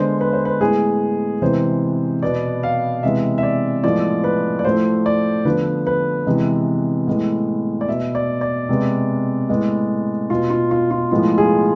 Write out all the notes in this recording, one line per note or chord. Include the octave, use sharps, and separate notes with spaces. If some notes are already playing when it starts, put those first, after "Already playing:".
Already playing: D3 G#3 B3 C5
B4
C5
B4
A2 G#3 B3 G#4
C3 E3 G#3 B3 C5
B2 B3 D5
F5
C3 E3 G#3 B3 E5
E5
D5
A2 F3 G#3 B3 D5
B4
D5
A2 F3 A3 C5
D5
D3 F3 B3 B4
B4
C3 E3 G#3 B3
A2 G#3 B3
D5
B2 B3 E5
D5
D5
C3 G#3 B3
A2 G#3 B3
B2 B3 F4
F4
F4
F4
A2 F3 G#3 B3 F4
G#4